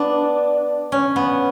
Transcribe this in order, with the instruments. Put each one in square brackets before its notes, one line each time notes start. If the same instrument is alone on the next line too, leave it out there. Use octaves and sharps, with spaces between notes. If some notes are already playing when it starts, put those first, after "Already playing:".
Already playing: [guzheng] B3 D4
C#4
B3